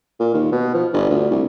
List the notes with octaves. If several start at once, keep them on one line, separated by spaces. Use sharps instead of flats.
A#2
D#2
B2
F3
G1
D2
C2